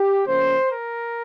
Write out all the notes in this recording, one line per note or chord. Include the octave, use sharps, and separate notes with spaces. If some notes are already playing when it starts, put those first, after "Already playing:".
Already playing: G4
C#3 F3 A#3 C#4 C5
A#4